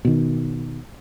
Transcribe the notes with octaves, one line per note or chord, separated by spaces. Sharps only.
B2 D#3